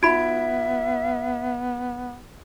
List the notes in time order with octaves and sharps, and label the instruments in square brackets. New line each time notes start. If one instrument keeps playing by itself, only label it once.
[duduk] B3 [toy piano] D#4 F#4 B5 [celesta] F4 G#6 D7 [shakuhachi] E5